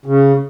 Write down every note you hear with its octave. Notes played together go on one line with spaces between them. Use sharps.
C#3